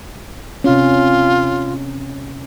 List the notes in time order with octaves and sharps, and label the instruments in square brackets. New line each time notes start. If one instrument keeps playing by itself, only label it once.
[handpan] C3 C#4 [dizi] F4